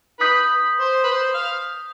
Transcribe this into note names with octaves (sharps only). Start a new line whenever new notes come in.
D#4 B4 D#6 G6 B6
C5
B4
C5
F5